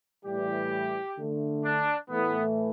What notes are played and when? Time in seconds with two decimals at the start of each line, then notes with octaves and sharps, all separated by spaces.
0.25 A2 E3 G3 G4
1.18 D3 A3
1.64 D4
2.10 A2 E3 A3 B3